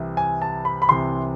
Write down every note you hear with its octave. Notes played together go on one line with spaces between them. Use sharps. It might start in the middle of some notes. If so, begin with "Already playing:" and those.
Already playing: C2 C3 E3
G#5
A5
B5
B5
C2 C3 E3 C6